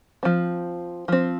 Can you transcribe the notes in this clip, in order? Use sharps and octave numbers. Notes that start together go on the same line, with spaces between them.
F3 C4
F3 C4